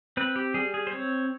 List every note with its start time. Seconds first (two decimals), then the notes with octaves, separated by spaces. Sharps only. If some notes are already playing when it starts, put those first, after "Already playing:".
0.17 C4 B4
0.36 G4
0.54 G3 G#4
0.74 G#4
0.87 C5
0.92 C4 C#5